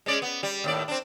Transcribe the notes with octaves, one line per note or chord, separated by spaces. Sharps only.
G#3 C#4 D5
B3
G3
D#2 A2 D5
C4 D4